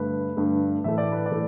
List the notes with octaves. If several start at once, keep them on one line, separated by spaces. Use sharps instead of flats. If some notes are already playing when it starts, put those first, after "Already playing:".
Already playing: G2 D3 A3 B4
G2 D3 A3
A2 E3 A3 E5
D5
B4
D5
A2 E3 A3